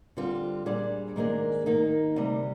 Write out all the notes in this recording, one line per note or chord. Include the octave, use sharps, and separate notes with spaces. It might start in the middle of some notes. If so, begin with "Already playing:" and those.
D3 G3 C4 F4
A#2 G3 D4 G#4 C5
G#2 D#3 A#3 D4 G#4
D#3 A#3 D#4
D2 C3 G3